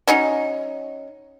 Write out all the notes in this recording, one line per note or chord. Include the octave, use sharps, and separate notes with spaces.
F#3 C#4 D#4